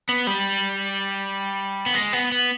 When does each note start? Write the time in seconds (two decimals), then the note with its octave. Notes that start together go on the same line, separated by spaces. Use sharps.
0.09 B3
0.27 G3
1.86 B3
1.94 G#3
2.13 B3
2.32 B3